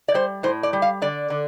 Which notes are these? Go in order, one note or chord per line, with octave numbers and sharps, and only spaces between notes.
D5
G3 C5
A2 C5
D5
G3
F5
D3 D5
D3